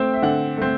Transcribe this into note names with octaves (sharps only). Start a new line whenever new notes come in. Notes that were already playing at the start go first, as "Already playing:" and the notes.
Already playing: A3 C4 G5
E5
D3 F#5
A3 C4